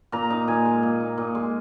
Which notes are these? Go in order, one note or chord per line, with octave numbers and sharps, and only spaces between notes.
A#2 A#5
D#4
A#2 G#5
G#3
A#2
D#4
A#2
G#3